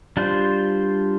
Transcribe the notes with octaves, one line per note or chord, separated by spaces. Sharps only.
G3 D4 F4 C5